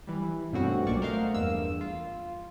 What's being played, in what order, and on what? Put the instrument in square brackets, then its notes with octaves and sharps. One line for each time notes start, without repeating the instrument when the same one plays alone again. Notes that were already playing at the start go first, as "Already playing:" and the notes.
[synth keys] E3 G3
G2 B2 A3 C4 C#4 F#4
B1 A#2 A#3 D5 C#6
A3 A#4 C5 D#5 F5 F#5
E2 G2 A#3 E6
F4